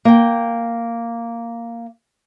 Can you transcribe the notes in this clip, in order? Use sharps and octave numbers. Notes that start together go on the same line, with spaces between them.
A#3 G5